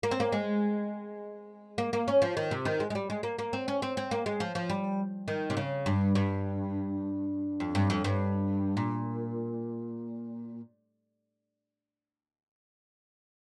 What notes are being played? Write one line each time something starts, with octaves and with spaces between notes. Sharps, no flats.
A#3
C4
A#3
G#3
A#3
A#3
C#4
F3
D#3
C3
D#3
G#3
G#3
G3
G#3
A#3
A#3
C4
C#4
C4
C4
A#3
G#3
F3
F3
G3
D#3
C3
C#3
G2
G2
F2
G2
F2
G2
A#2